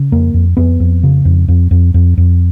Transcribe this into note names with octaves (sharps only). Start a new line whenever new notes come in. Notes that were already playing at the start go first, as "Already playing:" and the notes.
Already playing: C#3
F2 A#3
F2
F2 B3
F2
C#3
F2
F2
F2
F2
F2